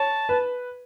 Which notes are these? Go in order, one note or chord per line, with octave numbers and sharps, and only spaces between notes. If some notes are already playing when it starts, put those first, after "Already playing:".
Already playing: C#5 A5
B4